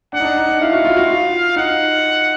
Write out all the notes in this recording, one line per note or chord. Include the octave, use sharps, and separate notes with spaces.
D4 F#5
D#4
D4
D#4
D4
E4 F5
F#4
F4
F#4
F4
D#4 F#5